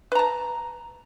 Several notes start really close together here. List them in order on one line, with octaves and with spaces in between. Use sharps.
B4 A#5 A5